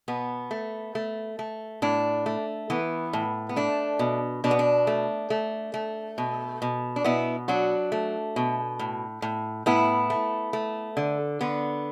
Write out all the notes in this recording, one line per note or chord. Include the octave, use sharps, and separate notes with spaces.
B2 B3
A3
A3
A3
A2 D4
A3
E3 B3
A2
B3
A3 D4
B2
B2 D4
B3
D4
A3
A3
A3
B2
B2
D4
B2 B3 E4
F#3 D4 F#4
A3
B2
A2
A2
A2 B3 E4
A3
A3
D3
D3 B3